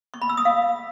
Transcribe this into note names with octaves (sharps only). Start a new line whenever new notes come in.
C#6
B5
E6
D#6
F5